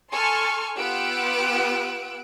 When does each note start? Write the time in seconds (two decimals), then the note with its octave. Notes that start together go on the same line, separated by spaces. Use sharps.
0.11 A4 G#5 C6 C#6 F6
0.76 B3 F4 G4 E6 F#6 D7